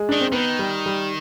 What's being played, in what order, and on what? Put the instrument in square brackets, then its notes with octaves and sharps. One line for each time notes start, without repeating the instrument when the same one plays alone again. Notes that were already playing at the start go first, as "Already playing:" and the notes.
Already playing: [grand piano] G#3
[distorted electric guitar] D#3 [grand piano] D4
[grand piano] C4
[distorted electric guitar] D#3 [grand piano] B3
[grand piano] G3
G3